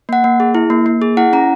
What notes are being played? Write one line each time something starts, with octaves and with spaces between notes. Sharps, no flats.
A#3 F#5
A#3
G#4
E4
A#3
A#3
G#4
E4 F#5
C#4 A#5